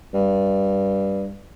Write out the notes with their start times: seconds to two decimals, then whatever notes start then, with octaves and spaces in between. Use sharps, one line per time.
0.14 G2